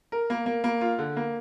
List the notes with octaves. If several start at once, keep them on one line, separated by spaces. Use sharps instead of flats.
A#4
A#3
A#3
A#3
F4
D3
A#3